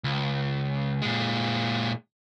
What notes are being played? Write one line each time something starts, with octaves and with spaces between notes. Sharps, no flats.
C#2
A#2 G#3